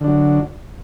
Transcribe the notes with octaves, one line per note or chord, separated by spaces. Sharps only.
D3 F#3 D4